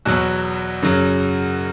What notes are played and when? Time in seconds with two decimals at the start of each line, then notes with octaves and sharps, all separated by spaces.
0.05 E2 B2 F#3 F#4
0.82 F#2 C#3 F#3